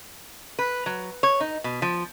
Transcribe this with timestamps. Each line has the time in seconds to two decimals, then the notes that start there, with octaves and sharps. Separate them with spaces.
0.59 B4
0.86 F#3
1.23 C#5
1.40 D#4
1.64 B2
1.82 F3